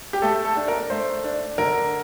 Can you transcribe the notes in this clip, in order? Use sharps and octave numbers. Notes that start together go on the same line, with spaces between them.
G4
A3 A4
A4
D4
A#4
A3 C5
D4
D3 A#4